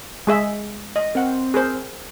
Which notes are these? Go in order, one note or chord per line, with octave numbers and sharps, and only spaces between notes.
G#3 G#4 E5
D#5
C4 A#4 F#5
G#4 A#4 C5